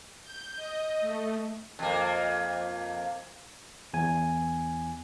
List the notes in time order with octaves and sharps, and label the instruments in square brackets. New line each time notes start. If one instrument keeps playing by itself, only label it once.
[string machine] G6
D#5
A3
[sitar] F2 A#3
[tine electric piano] E2 G#5